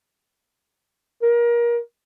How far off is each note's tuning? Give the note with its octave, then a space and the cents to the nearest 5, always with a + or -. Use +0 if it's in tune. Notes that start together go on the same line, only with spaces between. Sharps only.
A#4 +25